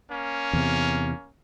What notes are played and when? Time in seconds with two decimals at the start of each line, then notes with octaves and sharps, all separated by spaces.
0.10 A#3 C#4
0.53 E2 C3